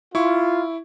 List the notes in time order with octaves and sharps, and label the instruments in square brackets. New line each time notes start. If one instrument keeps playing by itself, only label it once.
[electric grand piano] E4 C#6 [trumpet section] F4